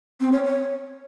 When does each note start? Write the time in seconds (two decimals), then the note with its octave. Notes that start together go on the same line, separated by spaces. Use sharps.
0.20 C4
0.32 C#5
0.44 C#5